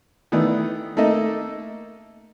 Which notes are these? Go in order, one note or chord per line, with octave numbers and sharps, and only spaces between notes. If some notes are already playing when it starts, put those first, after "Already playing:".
D#3 E3 A3 B3 D5
A3 A#3 D#4 A4 D#5 E5